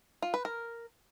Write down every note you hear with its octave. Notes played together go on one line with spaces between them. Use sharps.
F4
B4
A#4